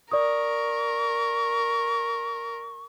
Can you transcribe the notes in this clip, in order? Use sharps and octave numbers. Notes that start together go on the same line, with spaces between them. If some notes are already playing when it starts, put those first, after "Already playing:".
A#4 D5 C#6 D#6